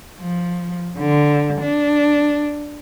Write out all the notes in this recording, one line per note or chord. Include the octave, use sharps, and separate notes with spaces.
F3
D3
D4